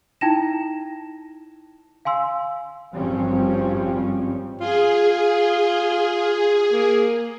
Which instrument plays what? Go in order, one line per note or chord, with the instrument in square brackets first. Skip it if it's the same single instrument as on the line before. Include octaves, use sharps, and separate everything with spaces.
[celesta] D#4 E4 G5 A5 A#6 E7
F5 G#5 C6 E6
[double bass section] G#1 G2 F3 G3 C4 C#4
[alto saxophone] F4 [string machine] G#4
[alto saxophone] A#3